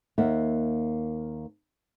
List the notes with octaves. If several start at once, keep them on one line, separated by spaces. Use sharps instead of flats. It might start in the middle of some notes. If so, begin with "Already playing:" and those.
D#2 A#3 A#4 E5 F#5